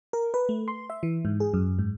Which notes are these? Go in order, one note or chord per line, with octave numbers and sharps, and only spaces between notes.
A#4
B4
A3
C6
E5
E3
G#2
G#4
F#2
G#2